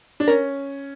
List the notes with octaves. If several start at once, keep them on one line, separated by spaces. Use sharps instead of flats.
D4
C#4 A#4